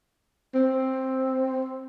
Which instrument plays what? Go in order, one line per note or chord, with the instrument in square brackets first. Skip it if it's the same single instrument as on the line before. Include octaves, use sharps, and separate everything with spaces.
[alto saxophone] C4